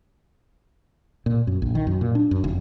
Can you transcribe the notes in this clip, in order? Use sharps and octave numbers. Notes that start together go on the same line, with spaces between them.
A#2
F#2
A#1
D#3
F#2
A#2
D4
F#2
F1